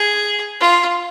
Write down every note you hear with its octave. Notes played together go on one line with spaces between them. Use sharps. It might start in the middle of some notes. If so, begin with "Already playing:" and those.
Already playing: G#4
F4